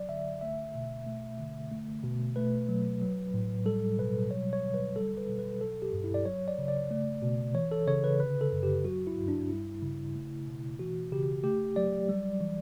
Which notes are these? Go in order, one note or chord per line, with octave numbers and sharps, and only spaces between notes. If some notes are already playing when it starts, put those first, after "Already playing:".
Already playing: F#3 D5
D3 E5
A3 E5
B2
A3
D3
A3
B2
A3 B4
F#3
F#3
A2
G3 A4
B2 B4
F#3 C#5
C#5
D3
B4
G3 A4
B4
B2
B4
F#3 A4
G4
G2
E4
D5
F#3 C#5
D5
C#3
D5
A3
B2
E3 C#5
A4
C#3 C#5
B4
D3 B4
A4
F#2
G4
F#3 F#4
E4
G2
D4
G3 E4
C#3
A3
B2
E3 F#4
C#3 G4
A3 G4
F#3 D5
G3
E3